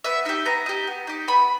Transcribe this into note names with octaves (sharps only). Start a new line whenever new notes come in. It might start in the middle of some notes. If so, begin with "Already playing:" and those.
B3 E5
D#4 G4 E5
B3 A#5
D#4 G4
B3
D#4 G4
B3 B5